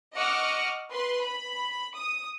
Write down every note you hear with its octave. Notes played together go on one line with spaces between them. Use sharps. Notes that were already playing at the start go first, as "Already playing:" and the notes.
D#5 F#5 C#6 D6 E6 F6
B4 C6
B5
D#6